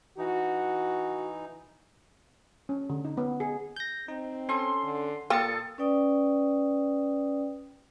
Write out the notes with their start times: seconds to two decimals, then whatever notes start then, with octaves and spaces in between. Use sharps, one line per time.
0.18 E3 D#4 F#4
2.69 C#4
2.90 D3
3.05 D#4
3.17 B3
3.40 G#4
3.76 G6 A#6
4.08 C4 D#4
4.49 C#4 A4 C6
4.83 D3
5.30 A#2 A#3 A4 G5 D#6 A6 C#7
5.78 C#4 B4 D5 G5 D#6